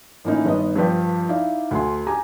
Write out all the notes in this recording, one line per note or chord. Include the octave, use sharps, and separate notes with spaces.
A2 E3 A#3 C#4 D#4 E4
G1 D#3 B3 D#5
G2 F3 B4 D5 G5
D#4 E4 D5 F5
D2 A3 G#5 C6
G4 G#5 A#5